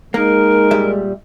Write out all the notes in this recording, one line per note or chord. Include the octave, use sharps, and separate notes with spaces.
G#3 A#3 D#4 A#4
A#2 G3 E5